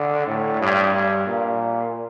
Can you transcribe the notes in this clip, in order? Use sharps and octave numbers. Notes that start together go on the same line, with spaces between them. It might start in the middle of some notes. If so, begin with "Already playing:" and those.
Already playing: D3
A2
G2
G2
A#2